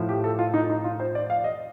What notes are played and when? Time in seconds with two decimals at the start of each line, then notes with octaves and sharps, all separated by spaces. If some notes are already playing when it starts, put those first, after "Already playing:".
Already playing: A2 F3
0.09 G4
0.24 A4
0.39 F4
0.54 D#4
0.70 D#4
0.84 F4
1.00 C5
1.15 D5
1.30 F5
1.44 D#5